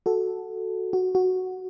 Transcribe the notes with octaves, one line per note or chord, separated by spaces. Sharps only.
F#4 A4
F#4
F#4